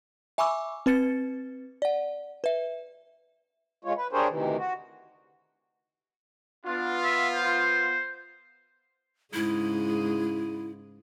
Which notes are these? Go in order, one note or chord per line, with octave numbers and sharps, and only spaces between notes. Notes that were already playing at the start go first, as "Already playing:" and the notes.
E5 G#5 B5 C#6 D6 E6
C4 B4 A6 C#7
D5 F#5
B4 E5
G#3 F4 C#5
B4
D4 G4 G#4 A#4 C5 C#5
D2 C3 D#3 E3
F#4
B3 D4 F4
E5
C5
G#2 C#3 E4 G#4